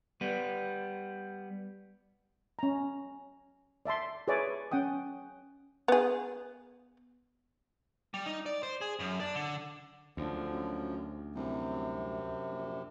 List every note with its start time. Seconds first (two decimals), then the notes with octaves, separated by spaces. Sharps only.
0.21 G3 B3
2.59 C#4 A#5
3.85 D5 E5 A5 C6
4.28 G#4 B4 C#5 D5 E5 G#5
4.71 C#4 F#5 G5 D#6
5.88 B3 G#4
8.14 G3
8.26 D#4
8.46 D5
8.63 C5
8.81 G#4
8.99 F#2
9.20 D4
9.35 D3
10.17 F#1 D2 D3 F3
10.52 F#2
11.35 C2 F#2 C3
12.52 A#1